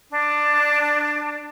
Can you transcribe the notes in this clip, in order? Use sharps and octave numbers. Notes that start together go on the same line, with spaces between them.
D4